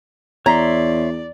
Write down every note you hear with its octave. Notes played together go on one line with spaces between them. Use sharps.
E2 C#5 D5 E5 A#5 C6